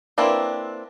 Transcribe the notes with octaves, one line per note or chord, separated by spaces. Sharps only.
A#3 C4 D4 E4 B4